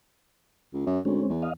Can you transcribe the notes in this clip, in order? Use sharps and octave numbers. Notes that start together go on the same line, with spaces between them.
C#2
F#2
D2 G#3 C4 C#4
E2
D#5 F5